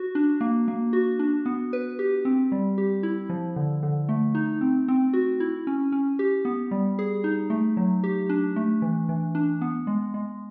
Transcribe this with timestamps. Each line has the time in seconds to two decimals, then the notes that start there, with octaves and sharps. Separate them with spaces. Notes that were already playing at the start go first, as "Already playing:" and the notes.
Already playing: F#4
0.15 D4
0.41 A#3
0.68 A#3
0.93 F#4
1.19 D4
1.46 B3
1.73 B4
1.99 G4
2.25 C4
2.52 G3
2.78 G4
3.03 E4
3.29 F3
3.56 D3
3.83 D3
4.09 A3
4.35 D#4
4.61 C4
4.88 C4
5.13 F#4
5.40 E4
5.67 C#4
5.92 C#4
6.19 G4
6.45 B3
6.71 G3
6.99 G#4
7.24 D#4
7.50 A3
7.77 F#3
8.04 G4
8.29 D4
8.56 A3
8.82 E3
9.09 E3
9.35 D4
9.61 B3
9.87 G#3
10.14 G#3